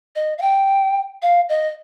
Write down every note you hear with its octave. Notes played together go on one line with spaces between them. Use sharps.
D#5
F5
G5
F5
D#5